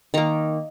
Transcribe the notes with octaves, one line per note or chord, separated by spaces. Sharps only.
D#3 A#3 A#5